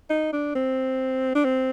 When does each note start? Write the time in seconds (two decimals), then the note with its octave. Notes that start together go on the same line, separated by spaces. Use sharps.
0.10 D#4
0.33 D4
0.55 C4
1.35 D4
1.44 C4